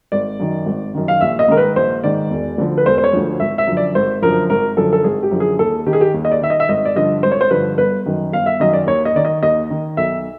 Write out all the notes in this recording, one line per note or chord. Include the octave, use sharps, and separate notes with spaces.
G#1 D5
F#2 D#3
G#1
F#2 D#3
F5
A#1 E5
D#5
G#2 D#3 A#4
B4
A#1 C5
G#2 D#3 D5
E1
D2 D3 F3
B4
E1 C5
C5
C#5
D2 D3 F3
G#1 E5
E5
F#2 D3 F3
D5
G#1 C5
F#2 D3 F3 A#4
G#1 A#4
F#2 D3 F3 A4
A4
G#1 G#4
G4
F#2 D3 F3
G#4
D#2 A4
D#3 G4
G#4
G4
D#2
D#5
D5
D#3 E5
D#5
E5
G#1 D#5
D5
G2 D3 F3 D#5
G#1 C5
C#5
C5
G2 D3 F3 B4
G1 B4
F#2 D#3
G1 F5
E5
F#2 D#3 D#5
D5
D#2 C#5
D#5
D#3 D5
D#5
D#2 D#5
D#3
B1 E5